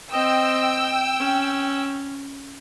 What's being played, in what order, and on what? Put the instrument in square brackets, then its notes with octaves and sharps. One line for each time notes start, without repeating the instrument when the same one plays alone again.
[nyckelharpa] C4 D#5 [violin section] G5 E6
[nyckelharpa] C#4